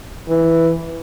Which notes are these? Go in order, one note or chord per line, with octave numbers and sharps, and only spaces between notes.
E3